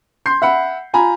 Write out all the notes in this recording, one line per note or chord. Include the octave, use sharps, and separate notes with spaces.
C6 G6 C7
E5 F#5 B5
F4 G#5 A#5 B5